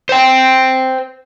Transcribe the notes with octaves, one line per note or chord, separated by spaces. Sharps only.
C5 G5